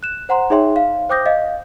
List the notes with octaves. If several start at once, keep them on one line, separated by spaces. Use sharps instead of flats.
F#6 E7
C5 F#5 A#5 C6
D#4 G#4 C#5 E5 G5 C6
F5
C5 G5 D6 D#6 G6 A#6
D#5 F5